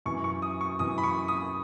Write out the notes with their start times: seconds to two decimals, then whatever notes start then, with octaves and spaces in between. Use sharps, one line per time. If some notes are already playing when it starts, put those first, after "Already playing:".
0.06 F#2 E3 C#6
0.24 C#6
0.42 D#6
0.61 C#6
0.79 F#2 E3 D#6
0.98 B5
1.03 C#6
1.28 D#6